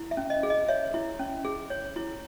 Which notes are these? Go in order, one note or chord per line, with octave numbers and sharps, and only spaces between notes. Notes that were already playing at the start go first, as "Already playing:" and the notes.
Already playing: E4
E5
C#4
D#5
G#4
D#5
C#5 E5
E4
C#4
G#4
C#5
E4